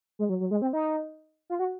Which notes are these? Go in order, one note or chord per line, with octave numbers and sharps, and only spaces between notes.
G#3
F#3
F#3
G#3
C4
D#4
F4
F#4